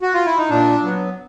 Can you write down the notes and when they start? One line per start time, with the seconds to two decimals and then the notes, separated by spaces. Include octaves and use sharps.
0.01 F#4
0.14 F4
0.26 E4
0.37 D#4
0.49 A#2 D4
0.83 F#3 B3